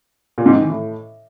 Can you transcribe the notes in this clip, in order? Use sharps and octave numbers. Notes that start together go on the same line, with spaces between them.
A#2
G#2
D#3
E3
A2